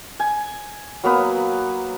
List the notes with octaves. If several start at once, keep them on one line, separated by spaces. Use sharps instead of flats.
G#5
F#3 A#3 B3 B4